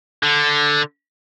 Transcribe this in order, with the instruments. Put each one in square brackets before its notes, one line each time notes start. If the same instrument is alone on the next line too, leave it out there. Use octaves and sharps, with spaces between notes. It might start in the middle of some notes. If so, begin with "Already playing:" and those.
[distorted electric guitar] D3